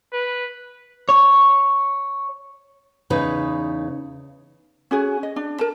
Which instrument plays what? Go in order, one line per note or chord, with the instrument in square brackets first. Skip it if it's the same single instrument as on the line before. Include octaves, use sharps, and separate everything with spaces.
[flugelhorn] B4
[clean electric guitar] C#5
[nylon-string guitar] E2 C#3 D#4 B4
[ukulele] C#4 F#4 G#4
D#5
D4
A#4 A5